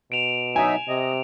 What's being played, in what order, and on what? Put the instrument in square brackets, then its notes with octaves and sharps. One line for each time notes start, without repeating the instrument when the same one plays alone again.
[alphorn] B2 [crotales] D7 E7 F7
[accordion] F#3 D#4 E5 [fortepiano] G#5
[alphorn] C3 [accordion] D#5